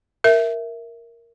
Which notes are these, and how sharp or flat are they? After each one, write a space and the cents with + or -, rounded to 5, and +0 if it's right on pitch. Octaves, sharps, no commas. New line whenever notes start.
A#4 +0 E5 +0